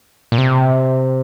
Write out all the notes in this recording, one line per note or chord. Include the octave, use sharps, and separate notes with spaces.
A#2
C3